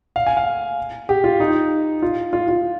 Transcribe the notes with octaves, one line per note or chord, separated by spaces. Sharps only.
F5
G#5
F5
G4
F4
D#4
F4
F4
F4